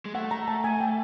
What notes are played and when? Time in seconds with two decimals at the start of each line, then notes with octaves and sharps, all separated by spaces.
0.05 G#3
0.15 A3 F#5
0.31 A#5
0.48 A5
0.64 G#5
0.80 G5